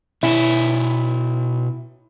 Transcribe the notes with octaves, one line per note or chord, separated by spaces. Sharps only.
B2 E4 C#5 G#5